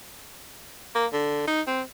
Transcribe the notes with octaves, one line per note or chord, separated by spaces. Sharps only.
A#3
D3
D#4
C4